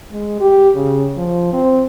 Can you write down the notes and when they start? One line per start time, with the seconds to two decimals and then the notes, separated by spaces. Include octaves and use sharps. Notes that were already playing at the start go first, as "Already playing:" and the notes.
0.11 G#3
0.40 G4
0.75 C#3
1.17 F3
1.53 C4